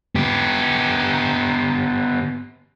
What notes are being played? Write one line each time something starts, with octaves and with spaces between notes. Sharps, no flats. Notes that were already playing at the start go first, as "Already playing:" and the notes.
B3 G4